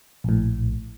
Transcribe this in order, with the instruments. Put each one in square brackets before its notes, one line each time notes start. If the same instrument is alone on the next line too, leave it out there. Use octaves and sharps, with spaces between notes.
[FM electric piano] A#1 A2